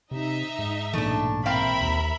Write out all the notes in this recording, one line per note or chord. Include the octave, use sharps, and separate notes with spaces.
C3 D#4 D#5 E5
G#2
B1 A#2 E3 A3 D4
C4 A#4 E5 F5 G5 B5
D#2